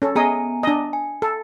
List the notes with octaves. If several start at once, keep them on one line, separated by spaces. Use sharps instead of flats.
C#4 A4
B3 G#4 D#5 G#5 A#5
D4 D#5
G#5
A4